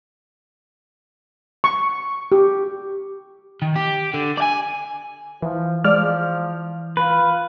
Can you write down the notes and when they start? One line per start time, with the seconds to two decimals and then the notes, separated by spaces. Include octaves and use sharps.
1.64 C#6
2.32 G4
3.62 D#3
3.76 G4
4.14 D3
4.38 D5 G#5
5.42 E3 F3
5.84 F3 G#3 D5 F6
6.97 F4 B4